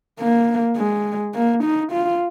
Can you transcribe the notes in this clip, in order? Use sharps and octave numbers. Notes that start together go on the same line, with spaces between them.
A#3
G#3
A#3
D#4
F4